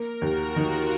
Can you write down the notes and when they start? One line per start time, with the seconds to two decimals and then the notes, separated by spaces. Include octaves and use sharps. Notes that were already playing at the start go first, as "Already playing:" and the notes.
Already playing: A#3 A#4
0.21 D#2 F#4
0.56 D#3 F4